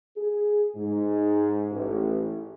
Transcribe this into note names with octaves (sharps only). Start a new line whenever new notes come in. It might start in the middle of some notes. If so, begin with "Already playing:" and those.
G#4
G#2
A1